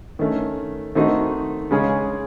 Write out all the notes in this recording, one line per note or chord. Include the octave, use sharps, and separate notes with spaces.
D#3 A3 C#4
D#3 A3 C4 D#4 F#4
C#3 G#3 C#4 G#4